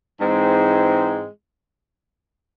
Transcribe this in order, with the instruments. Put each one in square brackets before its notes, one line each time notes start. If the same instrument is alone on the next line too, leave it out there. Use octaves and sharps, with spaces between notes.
[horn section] G#2 E3 G#3 C4